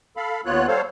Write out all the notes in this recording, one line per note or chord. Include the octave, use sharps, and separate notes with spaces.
A4 F5 B5
D#2 B3 F4 C#5 F#6
G3 A4 C5 C#5 F5